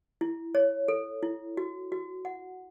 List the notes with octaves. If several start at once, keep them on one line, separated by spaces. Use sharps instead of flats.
E4
C#5
A4
E4
F#4
F#4
F#5